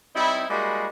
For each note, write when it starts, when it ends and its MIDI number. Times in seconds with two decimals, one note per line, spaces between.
0.15 0.44 55
0.15 0.44 60
0.15 0.44 63
0.15 0.44 64
0.49 0.87 55
0.49 0.87 56
0.49 0.87 58
0.49 0.87 64
0.49 0.87 66
0.49 0.87 68